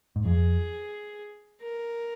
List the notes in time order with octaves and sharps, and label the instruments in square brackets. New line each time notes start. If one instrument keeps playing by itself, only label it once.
[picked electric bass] G#2
[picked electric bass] F2 [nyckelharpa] G#4
[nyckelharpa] A#4